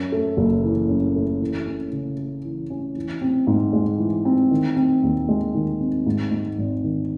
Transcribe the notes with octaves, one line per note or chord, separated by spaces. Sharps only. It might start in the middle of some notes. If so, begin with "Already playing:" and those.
Already playing: F#2
A3
F#1
E3
F#2
A3
E3
C#4
C#3
A3
E3
C#4
E3
C4
G#2
G#3
E3
C4
D#3
C4
D#2
G#3
D#3
C4
G#2
G#3
G#1
D#3